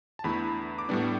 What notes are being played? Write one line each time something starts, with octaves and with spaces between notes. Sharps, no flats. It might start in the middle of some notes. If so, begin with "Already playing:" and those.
A5
E2 D3 A3 E4 B5
D6
A2 G3 B3 D4